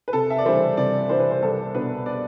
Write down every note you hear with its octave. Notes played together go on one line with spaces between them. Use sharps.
B4
C3 A4
E5
D5
E3 G3 D4 C5
C3 D5
E3 G3 D4 C5
B4
C5
C2 A4
B2 B3 D4 B4
D5